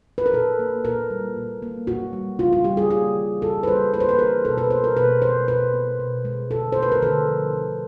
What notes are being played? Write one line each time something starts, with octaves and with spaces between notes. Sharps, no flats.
B4
A#4
A#2 A4
A#3
A#2 A#4
G3
A#2
A#3
A#2 F#4
G3
C#3 F4
F4
G3 G4
G#4
A#3 G#4
E3
C#3 A4
B4
G3 C5
A#3 B4
C5
B4
E3 A#4
B2 A4
B4
B3 C5
A#4
B2 B4
G#3 C5
B2 B4
B3
B2
G#3
D3 A4
A3 C5
B4
A#4
D3 A4
F3
D3